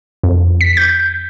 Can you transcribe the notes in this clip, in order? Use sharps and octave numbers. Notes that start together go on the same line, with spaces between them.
F2
B6
G6